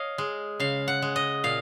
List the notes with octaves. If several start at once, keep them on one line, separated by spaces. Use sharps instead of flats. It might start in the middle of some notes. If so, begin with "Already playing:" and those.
Already playing: C#5 D#5 F5
G#3
C#3 F5
F#5
G#3
D#5
A#2 F5